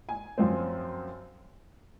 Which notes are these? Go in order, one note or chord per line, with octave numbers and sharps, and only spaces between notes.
G#5
F#2 F3 C4